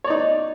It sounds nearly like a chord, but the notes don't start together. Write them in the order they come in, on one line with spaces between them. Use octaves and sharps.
C#5 D5 D#4